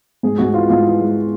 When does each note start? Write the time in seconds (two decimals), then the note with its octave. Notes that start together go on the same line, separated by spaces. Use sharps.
0.23 G#2 G#4
0.38 G#2 F#4
0.54 E3 F4
0.69 G#2 F4
0.85 E3
1.01 G#3